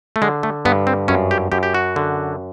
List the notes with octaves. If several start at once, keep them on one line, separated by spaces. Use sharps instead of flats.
A3
D3 G#3
A3
G2 B3
C4
F#2 C#4
G4
F#2 G4
G4
F#4
D3